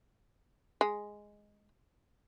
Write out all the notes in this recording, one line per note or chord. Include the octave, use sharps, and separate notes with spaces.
G#3